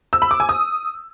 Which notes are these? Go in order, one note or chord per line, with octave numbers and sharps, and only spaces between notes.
E6
B5
D6
G#5
D#6